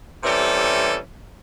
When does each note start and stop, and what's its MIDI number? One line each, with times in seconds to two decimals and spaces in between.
0.24 0.97 48
0.24 0.97 52
0.24 0.97 55
0.24 0.97 61
0.24 0.97 69